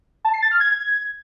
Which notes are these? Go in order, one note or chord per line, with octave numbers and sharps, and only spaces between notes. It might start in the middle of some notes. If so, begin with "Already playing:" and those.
A5
C7
A6
F6
G#6